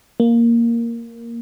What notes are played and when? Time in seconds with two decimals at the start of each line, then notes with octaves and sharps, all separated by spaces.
0.20 A#3